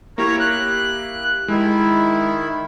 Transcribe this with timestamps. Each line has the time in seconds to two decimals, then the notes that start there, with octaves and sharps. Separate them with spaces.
0.18 A#3 E4 G4 A#4 C#5 A#5
0.40 F#6
1.48 D#3 G#3 E4